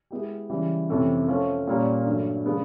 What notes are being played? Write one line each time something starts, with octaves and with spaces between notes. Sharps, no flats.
G#3 B3 E4 G4
C#3 E3 G3
F2 C3 E3 A3 C#4
F3 A3 C#4
A#2 G3 A#3 C#4
G2 D3 F#3 A3
C#3 F3 G#3 B3 D4